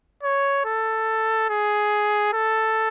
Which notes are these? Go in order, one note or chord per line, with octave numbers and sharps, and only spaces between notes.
C#5
A4
G#4
A4